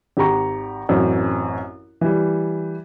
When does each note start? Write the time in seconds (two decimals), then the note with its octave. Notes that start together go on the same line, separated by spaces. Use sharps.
0.17 G#1 G4 A#5 C#6
0.89 A1 F#2 C4
2.01 E3 G3